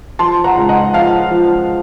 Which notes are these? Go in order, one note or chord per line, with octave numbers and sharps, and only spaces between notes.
F3 A5 C6
F#5 A#5
C#2
D#5 F#5
F3 F5 A5
F3